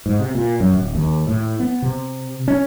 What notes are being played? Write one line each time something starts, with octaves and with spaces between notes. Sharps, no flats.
G#2
C3
A#2
F#2
D1
D#2
A2
B3
C3
C#4